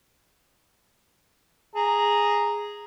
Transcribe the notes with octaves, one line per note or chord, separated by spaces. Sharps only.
G#4 A#5